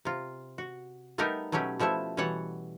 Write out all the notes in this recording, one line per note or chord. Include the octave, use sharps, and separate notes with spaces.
C3 F4
F#4
G3 A3 B3 D#4 G4 A#4
B2 F#3 A3 C#4 G4
B2 F3 A3 E4 E5
B2 E3 G3 C#5 F#5 A5